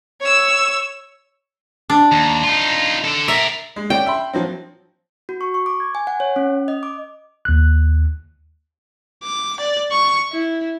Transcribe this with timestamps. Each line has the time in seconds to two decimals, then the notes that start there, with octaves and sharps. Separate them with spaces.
0.21 C#5 E6
1.90 D4
2.12 D#2
2.44 D#4 F4
3.04 D3 A4
3.28 D4 A#4 E5
3.76 G#3
3.90 C#4 D5 G5
4.06 E5 B5 C6
4.34 F3 F#3 C4
5.29 F#4
5.41 C#6
5.54 C#6
5.66 D6
5.80 G#6
5.95 G#5
6.07 F#5
6.20 C#5
6.36 C#4
6.68 D#5
6.83 D6
7.45 D#2 F#6
9.23 D6
9.60 D5
9.91 C#6
10.32 E4